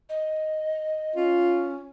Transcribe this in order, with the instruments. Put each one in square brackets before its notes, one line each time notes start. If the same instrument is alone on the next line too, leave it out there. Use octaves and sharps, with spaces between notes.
[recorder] D#5
[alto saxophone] C#4 [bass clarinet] F4